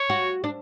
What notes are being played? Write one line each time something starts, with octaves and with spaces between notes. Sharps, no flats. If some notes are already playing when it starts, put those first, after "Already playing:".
Already playing: C#5
F#4
D4